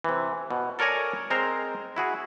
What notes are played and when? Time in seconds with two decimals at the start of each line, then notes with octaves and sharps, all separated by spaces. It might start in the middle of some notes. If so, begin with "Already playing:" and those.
0.04 C3 E3
0.50 B2
0.79 A4 A#4 C#5 D5 G#5 A#5
1.30 G#3 C4 A#4 C5 A#5
1.96 E4 F#4 G#4